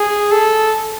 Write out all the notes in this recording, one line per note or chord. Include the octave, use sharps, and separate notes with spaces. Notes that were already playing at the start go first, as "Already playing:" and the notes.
Already playing: G#4
A4